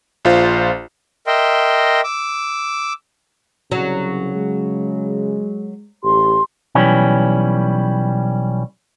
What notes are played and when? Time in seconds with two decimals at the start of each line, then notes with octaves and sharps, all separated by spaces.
0.25 A#1 F4 C5
1.27 A#4 D#5 E5 G5 C6
2.04 D6 E6
3.71 C2 C#3 F#3
4.35 G#3
6.04 A1 G4 C6
6.75 B1 E3 G3 C#4